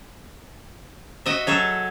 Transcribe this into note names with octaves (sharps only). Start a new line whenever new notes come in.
F#4 D#5 E5
F#3 G#4 A4 A5